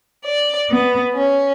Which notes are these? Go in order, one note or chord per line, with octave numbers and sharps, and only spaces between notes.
D5
B3
C#4